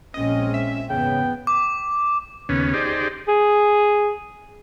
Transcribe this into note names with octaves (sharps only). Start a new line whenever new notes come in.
A#1 G#3 C4 C#4 D#5
E5
E2 G#2 C#3 B3 G5
D6
D#2 C#3 B3 C#4
D#4 G4 G#4 C5 D5
G#4